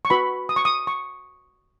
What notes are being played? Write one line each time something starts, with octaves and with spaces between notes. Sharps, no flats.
C#6
F#4 B4 B5
D#6
C#6
D#6
C#6